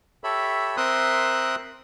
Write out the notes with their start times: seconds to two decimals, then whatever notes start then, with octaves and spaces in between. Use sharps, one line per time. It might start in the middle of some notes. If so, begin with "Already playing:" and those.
0.24 G4 A4 C#5 E5 B5
0.77 C4 A#4 E5 C6 D#6 F#6